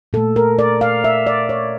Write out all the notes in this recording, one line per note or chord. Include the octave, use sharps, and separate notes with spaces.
A#2 A3 A4
A#4
D5
F5
E5
D5
C#5